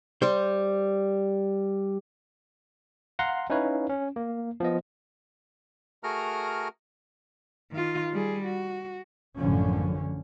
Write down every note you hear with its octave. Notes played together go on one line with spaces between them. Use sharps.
G3 C5
F5 F#5 A#5 C6
C#4 D#4 E4 B4 C#5 F5
C#4
A#3
F3 B3 D#5
A3 F#4 G#4 A#4 A#5 F6
D#3 F4
G3 G#4
F#4
A1 F#2 D3 F3 C#4